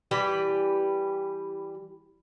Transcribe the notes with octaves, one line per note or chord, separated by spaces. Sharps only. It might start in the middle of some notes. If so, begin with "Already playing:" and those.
E3 G3 G4 B4